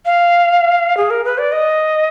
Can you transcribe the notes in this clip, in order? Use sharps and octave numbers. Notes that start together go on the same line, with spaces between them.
F5
G#4
A#4
B4
D5
D#5